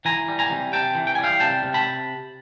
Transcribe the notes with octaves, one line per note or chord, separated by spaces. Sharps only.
E3 G#5 A#5
G3
G#5 A#5
C3
C3 G5 A5
E3
G5
G3 G#5
F5 G5
C3 G5 A5
C3
A5 B5